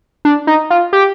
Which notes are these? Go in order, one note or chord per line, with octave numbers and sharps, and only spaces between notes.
D4
D#4
F4
G4